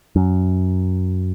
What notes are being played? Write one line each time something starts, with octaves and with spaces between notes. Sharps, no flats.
F#2